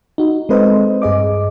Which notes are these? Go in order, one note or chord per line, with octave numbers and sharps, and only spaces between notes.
D#4 F#4
G#3 C4 A4 B4 C5 D#5
G2 G#4 D#5 D6